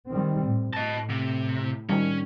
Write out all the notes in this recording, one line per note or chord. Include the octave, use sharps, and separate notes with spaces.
D#3 G3 C4
A2
A2 D#5 A5
C3
D#3 G3 C#4